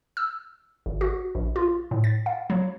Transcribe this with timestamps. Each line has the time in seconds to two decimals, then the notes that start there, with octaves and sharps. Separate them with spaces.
0.17 E6
0.86 G#1
1.01 F#4
1.35 A#1
1.56 F4
1.91 A2
2.04 A6
2.26 F5
2.50 F#3